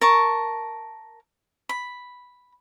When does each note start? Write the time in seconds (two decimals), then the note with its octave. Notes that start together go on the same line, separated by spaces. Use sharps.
0.01 A#4 A5 C#6
1.69 B5